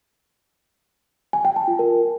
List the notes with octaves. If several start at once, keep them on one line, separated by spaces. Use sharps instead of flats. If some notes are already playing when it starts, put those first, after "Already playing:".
G#5
G5
A5
F4
A#4